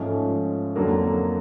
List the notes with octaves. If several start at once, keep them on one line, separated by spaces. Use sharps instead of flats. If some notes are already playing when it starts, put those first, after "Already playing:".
Already playing: G#2 F3 A3 C#4
F2 D3 F#3 A#3